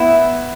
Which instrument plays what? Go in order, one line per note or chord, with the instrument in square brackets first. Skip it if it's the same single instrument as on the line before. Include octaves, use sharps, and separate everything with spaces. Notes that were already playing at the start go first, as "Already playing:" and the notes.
Already playing: [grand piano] B3 [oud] E4